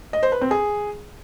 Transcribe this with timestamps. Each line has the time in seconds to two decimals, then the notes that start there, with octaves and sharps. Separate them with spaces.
0.13 D#5
0.23 C5
0.32 B4
0.41 C4
0.51 G#4